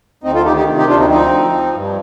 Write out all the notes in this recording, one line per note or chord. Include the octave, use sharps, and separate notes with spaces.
D2 C4 D#4
F4 A4
D#3 D#4 G4
D#4 G4
C3
D#4 G4
D2 D4 F4
C4 D#4
F3 C4 D#4
F3
F3
G2